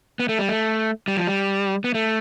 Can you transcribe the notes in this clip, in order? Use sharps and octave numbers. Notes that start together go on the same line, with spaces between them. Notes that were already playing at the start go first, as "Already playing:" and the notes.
B3
A3
G3
A3
G3
F3
G3
B3
A3